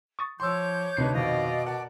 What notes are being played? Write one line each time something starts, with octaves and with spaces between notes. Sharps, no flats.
C#6 D#6 A6
F3 C#5 C6 D6 E6 G6
D2 C3 D4 D#4 B4 C7
F2 B2 D#3 D5 D#5 F5
A#4 D5 F#5 A5